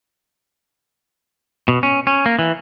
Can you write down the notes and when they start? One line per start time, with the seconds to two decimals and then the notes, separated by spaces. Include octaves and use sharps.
1.68 B2
1.83 C#4
2.07 C#4
2.26 A#3
2.39 E3